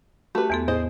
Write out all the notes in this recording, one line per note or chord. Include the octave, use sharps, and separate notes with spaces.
A3 F#4 G4 B4
E2 B3 A4 E5 C6
A2 G#4 C5 D#5